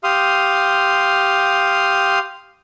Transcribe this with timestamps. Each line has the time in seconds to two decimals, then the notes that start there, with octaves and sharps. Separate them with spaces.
0.04 G4 F5 C6 D#6